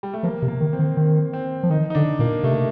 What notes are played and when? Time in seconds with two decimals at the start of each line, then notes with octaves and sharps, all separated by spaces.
0.03 G3
0.14 A3
0.23 F3 A#3
0.42 C3
0.48 A#3
0.61 D#3
0.73 C4
0.79 D#3
0.97 D#3 C4
1.33 C4
1.63 F3
1.70 D#3 D#4
1.90 D#4
1.95 D3 D4
2.19 A#2 A#3
2.43 C3 A3